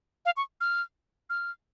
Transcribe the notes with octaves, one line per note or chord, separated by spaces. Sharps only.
F5
C#6
F6
F6